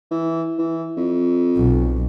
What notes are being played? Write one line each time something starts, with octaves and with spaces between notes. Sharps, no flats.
E3
E3
F2
B1